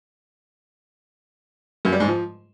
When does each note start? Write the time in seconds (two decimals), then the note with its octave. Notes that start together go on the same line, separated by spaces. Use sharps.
1.85 F#2
1.92 G3
2.00 G#2
2.08 F3